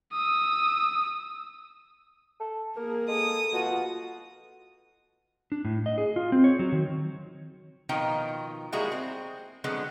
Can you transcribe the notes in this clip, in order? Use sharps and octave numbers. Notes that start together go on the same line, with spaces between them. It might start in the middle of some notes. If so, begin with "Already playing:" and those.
D#6 E6
A4
A#3 G#4 A#4
G#3 A4 D#6
B2 F4 F#4
D4
A2
D#5
G#4
F4
C4
C#5
F#3
D#3
B2 D#3 F3 D#4 F4 G5
G3 G#3 A#3 E4 F#4 G#4
C4
D3 F3 F#3 G#3 B3 C4